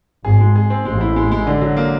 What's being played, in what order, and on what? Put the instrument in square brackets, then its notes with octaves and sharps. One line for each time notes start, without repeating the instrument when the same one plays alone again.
[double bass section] G#1 G#2 [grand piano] G#4
[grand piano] G#3
G#4
C4
[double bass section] A1 A2 [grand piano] G#3
[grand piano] E4
G#3
G#3
D3
F#3
A#3